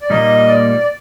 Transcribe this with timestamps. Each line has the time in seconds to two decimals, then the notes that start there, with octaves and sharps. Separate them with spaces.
0.02 D5
0.10 A#2 G3 A#3 D#4 D#5
0.48 D5
0.80 D5